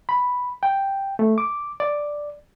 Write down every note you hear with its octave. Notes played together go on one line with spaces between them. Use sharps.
B5
G5
A3
D6
D5